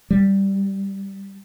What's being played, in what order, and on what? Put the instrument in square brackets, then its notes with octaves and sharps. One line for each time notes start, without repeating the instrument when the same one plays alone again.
[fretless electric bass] G3